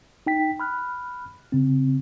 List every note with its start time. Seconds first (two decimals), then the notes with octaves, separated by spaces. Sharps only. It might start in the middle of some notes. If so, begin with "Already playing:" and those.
0.27 D#4 G5 B6
0.60 B5 F6 F#6
1.52 C#3 C4